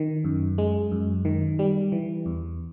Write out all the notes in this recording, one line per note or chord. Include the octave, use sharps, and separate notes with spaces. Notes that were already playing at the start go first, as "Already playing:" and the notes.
Already playing: D#3
F#2
G#3
F#2
D#3
G3
E3
E2